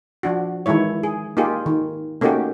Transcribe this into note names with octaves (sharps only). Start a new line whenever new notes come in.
F3 D4 F#4
D#3 E3 G#3 E4 C#5
G#4
A#3 D#4 F4 G4 G#4
D#3
A3 A#3 C#4 D#4 F#4 G4